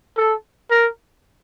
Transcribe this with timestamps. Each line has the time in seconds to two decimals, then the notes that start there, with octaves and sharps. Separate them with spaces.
0.17 A4
0.70 A#4